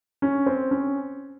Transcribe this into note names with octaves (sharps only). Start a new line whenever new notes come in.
C#4
C4
C#4